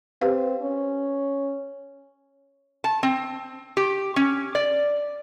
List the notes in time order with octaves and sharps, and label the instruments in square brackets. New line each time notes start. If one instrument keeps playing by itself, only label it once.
[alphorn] C4 [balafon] G4 B4 F5
[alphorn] C#4
[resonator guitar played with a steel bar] A5
C4
G4
C#4
D5